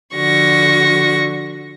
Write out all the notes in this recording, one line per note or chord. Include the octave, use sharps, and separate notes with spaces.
D3 F3 F#4 C#6 A#6